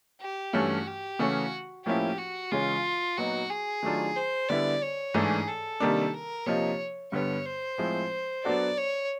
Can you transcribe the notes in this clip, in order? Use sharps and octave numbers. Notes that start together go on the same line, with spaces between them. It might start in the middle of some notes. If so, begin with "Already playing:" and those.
G4
G2 E3 A3 C#4 F#4
G4
C#3 E3 A3 C#4 F#4
A2 F3 A#3 C#4 E4 G4
F#4
C#3 E3 G#3 C#4 F4
A#2 F#3 B3 D#4 F#4
G#4
D#3 F#3 A3 D4 F4
C5
D3 G3 B3 E4 D5
C#5
G#2 E3 A3 D4 G#4
A4
C3 D#3 G3 A#3 D4
A#4
C3 F3 A#3 D#4 C#5
G2 D3 G3 B3 C#5
C5
A2 F3 G#3 C4 E4
F#3 B3 D4 F#4 A4 D5
C#5